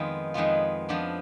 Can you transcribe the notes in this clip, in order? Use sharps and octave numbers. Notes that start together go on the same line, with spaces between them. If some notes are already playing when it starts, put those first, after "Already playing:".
Already playing: F2 D#3 G#3 B3 F4
F2 D#3 G#3 B3 F4
F3 B3 D4